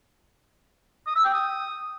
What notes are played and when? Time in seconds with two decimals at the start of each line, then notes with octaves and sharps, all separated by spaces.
1.07 D#6
1.16 E6
1.25 G5
1.34 D#6